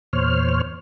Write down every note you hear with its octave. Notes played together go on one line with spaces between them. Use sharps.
E2 A#2 C5 C#5 F6